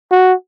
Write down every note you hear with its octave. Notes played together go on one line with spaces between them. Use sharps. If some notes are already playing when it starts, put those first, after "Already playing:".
F#4